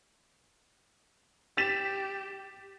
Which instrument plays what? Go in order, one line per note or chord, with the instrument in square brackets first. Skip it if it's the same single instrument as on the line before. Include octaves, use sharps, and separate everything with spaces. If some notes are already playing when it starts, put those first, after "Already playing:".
[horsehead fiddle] G4 [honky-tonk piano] A6 B6 E7